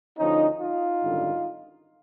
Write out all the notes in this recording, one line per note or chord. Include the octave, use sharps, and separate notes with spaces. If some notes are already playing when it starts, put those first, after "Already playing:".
D2 D3 F3 C#4 D#4
D#4 F4
G#1 F#2 D3 G3